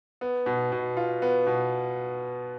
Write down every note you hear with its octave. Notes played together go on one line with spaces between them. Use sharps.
B3
B2
B2
F4
B3
B2